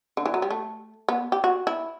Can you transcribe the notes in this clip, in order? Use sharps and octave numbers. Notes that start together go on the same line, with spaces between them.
D3
E3
F#3
G3
A3
B3
G4
F#4
E4